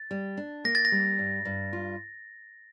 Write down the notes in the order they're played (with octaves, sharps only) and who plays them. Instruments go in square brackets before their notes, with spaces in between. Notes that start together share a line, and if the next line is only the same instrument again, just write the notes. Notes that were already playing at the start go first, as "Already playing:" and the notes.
Already playing: [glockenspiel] A6
[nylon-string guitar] G3
D4
[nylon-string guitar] A#3 [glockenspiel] A#6
[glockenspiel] A6
A#6
[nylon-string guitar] G3
G2
G2
F4